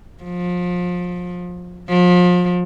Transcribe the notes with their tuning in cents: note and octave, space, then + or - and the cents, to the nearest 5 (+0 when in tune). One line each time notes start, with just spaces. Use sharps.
F3 +30
F3 +35